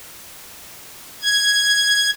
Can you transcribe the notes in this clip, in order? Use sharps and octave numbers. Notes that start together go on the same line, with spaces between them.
G#6